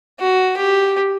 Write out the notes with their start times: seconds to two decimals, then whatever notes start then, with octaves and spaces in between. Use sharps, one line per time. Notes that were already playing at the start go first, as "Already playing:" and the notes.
0.19 F#4
0.57 G4